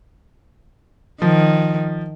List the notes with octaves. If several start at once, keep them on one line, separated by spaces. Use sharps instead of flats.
D#3 F3